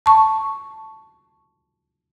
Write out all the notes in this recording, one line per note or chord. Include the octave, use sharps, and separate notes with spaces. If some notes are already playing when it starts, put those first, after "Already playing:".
A5 C#6